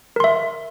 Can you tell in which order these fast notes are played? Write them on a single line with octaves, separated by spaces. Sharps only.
A#4 C6 E5